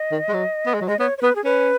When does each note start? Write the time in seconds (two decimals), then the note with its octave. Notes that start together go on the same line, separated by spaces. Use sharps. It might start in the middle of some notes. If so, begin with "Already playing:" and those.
Already playing: D#5
0.11 D#3
0.28 G#3
0.33 F#3
0.66 B3
0.74 G#3
0.81 F#3
0.87 G#3 D#5
0.99 B3 C#5
1.18 C#5
1.21 B3 B4
1.36 G#4
1.44 C#4 B4